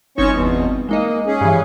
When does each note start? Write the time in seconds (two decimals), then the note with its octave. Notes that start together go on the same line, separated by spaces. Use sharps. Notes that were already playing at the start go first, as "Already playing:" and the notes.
0.18 G1 C4 C#4 D#4 C#5 C#6
0.32 E2 B2
0.89 G#3 A#3 D#4 D#5
1.27 C#4 G#4
1.41 G2 E3